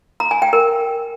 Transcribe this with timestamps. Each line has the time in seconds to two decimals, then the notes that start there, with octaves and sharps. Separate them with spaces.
0.20 A#5
0.31 G#5
0.42 G5
0.53 A#4